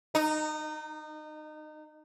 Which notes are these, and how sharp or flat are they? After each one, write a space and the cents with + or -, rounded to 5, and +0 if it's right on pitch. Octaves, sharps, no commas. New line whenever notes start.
D#4 -25